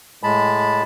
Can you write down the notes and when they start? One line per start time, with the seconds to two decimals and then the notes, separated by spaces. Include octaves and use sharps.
0.23 A2 G#3 A5 B5